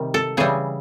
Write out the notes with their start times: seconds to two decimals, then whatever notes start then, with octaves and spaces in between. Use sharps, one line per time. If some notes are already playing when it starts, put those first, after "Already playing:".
Already playing: C3 D#3 G3
0.14 A4
0.37 C#3 E3 G3 G#4